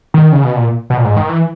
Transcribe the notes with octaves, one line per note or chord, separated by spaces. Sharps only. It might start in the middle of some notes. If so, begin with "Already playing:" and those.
D#3
C#3
B2
A#2
B2
A#2
G#2
D#3
E3